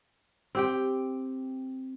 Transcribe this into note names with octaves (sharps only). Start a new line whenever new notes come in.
C4 G4 G5